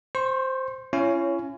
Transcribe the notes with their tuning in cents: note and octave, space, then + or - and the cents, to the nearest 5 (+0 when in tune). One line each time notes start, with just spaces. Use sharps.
C5 +0 C#6 -40
C#4 +0 E4 +45 C#5 +15